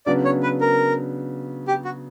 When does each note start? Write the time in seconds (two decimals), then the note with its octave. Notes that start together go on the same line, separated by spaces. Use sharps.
0.06 C#3 F#3 B3 D4 D5
0.25 C#5
0.43 B4
0.61 A#4
1.68 G4
1.85 F#4